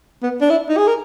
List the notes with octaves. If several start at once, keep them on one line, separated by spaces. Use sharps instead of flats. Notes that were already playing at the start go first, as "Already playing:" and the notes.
B3
D4
E4
D#4
G#4
A#4